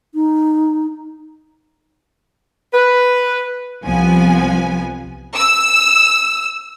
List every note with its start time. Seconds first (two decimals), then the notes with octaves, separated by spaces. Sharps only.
0.15 D#4
2.74 B4
3.84 C2 F3 B3 G#5
5.36 E6